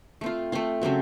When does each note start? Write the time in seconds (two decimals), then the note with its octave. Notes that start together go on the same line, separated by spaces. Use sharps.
0.21 A3 C4 F4
0.52 A3 C4 F4
0.82 C#3 F#3 C4 F#4